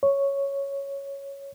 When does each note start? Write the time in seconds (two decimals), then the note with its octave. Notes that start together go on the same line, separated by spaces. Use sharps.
0.03 C#5